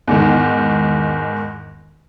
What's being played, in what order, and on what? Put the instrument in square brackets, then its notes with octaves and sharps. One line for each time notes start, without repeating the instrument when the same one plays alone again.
[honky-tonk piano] E2 G#2 D#3